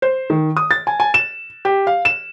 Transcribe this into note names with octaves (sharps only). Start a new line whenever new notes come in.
C5
D#3
D#6
A6
G#5
G#5
E7
G4
F5
E7